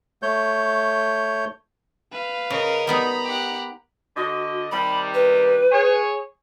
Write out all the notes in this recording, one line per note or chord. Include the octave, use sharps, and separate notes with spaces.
A3 C#5 G6
B4 F5
C#3 A#4 D#5
G3 B3 D#4 A#5 B5
G4 F#5
D3 F#4 D#5
C3 D#3 G3 B5
B4
G#4 C#5